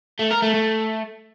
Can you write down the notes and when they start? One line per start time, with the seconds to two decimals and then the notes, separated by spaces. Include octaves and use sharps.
0.19 A3
0.31 A#4
0.43 A3
0.54 A3